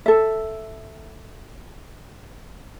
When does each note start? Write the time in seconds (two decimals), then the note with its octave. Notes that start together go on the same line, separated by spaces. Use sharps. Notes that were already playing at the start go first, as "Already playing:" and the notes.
0.06 A4 E5